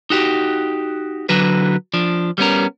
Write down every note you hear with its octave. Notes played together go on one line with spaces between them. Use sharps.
D#4 F#4 G4
D3 F#3 F#4 B4
F3 D4
G3 B3 C#4 A#4